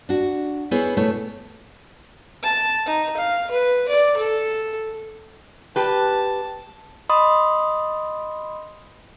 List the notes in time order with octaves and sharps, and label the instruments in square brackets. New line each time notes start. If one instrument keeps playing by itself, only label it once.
[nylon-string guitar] D4 F#4
B3 E4 G#4 C5 C#5
B2 A3 B3 C#5
[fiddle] A5
D#4
F5
B4
D5
A4
[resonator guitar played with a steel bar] G4 B4 [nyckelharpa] A5
[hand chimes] D#5 B5 C6 D#6